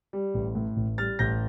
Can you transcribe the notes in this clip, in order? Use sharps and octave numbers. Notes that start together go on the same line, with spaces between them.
G3
A1
A2
A1
G3 F6 A6
A1 G6 A#6